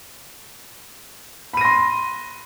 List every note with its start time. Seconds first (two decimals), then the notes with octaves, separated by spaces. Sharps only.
1.53 B5
1.57 D#7
1.61 A#6
1.65 C6